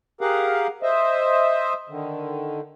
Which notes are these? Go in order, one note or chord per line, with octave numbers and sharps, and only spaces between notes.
G4 G#4 A#4 F5 F#5
C5 D#5 E5
D3 D#3